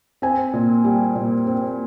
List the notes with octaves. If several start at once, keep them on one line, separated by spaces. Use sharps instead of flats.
C4 G#5
A#2
G3
A#2
C4